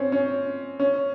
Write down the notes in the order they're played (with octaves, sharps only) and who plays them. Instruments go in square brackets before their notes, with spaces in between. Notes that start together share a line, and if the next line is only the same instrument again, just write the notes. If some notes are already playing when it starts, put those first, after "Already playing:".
Already playing: [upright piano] C4 C#4
C#4
C#4